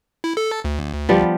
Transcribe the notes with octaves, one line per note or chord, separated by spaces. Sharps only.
E4
A4
D2
F3 G3 B3